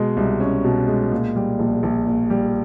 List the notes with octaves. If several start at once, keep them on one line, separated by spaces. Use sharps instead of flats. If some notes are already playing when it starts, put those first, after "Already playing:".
Already playing: B2 G#3
C2
C#4
B2
G#3
A#2
G3
A#1
A#1
A#2
G3